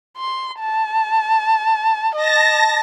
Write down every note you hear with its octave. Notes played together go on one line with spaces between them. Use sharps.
C6
A5
D#5 A5 A#6